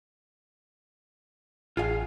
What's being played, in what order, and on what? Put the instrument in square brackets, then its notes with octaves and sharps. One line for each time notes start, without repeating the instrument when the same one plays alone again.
[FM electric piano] A1 [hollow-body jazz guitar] F4 G#4 F5